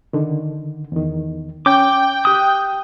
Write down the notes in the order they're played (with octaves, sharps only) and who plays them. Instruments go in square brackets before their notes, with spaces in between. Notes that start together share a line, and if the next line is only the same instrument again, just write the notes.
[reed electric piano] D3 D#3
E2 D#3
[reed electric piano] C#4 [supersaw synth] G5 [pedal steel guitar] D6 G6
[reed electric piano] G4 F#6 [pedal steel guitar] D#6